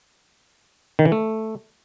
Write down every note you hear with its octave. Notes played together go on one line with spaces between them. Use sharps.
D#3
E3
A3